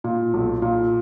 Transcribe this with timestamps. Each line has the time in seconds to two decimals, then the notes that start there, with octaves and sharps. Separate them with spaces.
0.04 A#2
0.34 B1
0.62 A#2